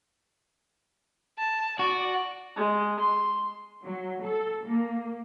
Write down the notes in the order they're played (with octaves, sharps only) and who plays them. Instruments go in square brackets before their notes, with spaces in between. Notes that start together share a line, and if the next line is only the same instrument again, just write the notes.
[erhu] A5
[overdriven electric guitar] F#4 [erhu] D5
[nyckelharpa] G#3
C6
[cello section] F#3
A4
A#3